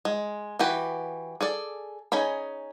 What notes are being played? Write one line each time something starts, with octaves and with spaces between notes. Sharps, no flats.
G#3
E3 F#4 G4 B4
G#4 A4 D5
C#4 D#4 G#4 B5